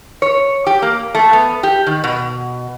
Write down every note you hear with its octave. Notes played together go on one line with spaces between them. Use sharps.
C#5
G4
A#3
A3
B3
G4
D#3
B2